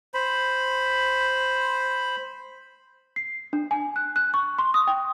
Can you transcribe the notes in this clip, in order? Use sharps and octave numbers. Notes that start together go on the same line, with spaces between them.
C5 B5
C7
D4
G#5
F#6
F#6
C#6
C6
D#6
G5